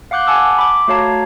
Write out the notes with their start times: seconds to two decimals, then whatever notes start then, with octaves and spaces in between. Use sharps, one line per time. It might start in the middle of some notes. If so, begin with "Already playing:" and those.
0.11 F5 F#5 D6 F#6 G6
0.27 F#5 G#5 A5 D6 E6
0.58 B5 D6
0.88 A3 F#4 C#5 F5 A5 A#5